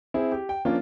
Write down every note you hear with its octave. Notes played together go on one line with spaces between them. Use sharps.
C4 E4 G#4
G4
G5
F3 A#3 C#4 D4 F4